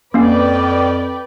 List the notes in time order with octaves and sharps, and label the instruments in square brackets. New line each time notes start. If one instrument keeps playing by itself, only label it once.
[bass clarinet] F2 [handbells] A#3 C#4 F5 [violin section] B4 D5 G5